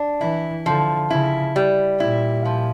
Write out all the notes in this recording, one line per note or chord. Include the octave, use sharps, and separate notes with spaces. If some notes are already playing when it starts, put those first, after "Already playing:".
Already playing: D4
E3 E4
D3 F3
C#3 E4
G3
A#2 E4
F3